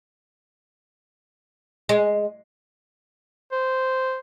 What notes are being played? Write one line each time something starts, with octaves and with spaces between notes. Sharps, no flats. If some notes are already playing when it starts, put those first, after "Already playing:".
G#3
C5